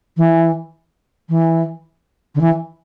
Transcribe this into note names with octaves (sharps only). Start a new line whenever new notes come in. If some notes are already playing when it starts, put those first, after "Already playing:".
E3
E3
D3
E3